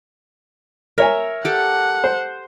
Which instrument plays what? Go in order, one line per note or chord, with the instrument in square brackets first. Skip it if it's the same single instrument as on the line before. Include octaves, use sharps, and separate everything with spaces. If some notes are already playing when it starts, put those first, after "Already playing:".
[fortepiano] A#4 C#5 G#5 [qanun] E5
[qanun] G4 A4 [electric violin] F#5
[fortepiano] C5